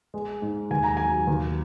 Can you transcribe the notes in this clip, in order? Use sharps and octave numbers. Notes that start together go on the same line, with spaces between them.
G#3
G#2
D#2 G#5
A#5
F#3 G#5
D#2